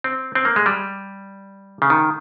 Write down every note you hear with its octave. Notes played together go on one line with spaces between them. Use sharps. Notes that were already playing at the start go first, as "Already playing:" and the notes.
C4
C4
A#3
G#3
G3
C#3
D#3